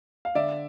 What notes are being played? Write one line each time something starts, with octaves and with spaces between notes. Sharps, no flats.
F5
D3 D5 E5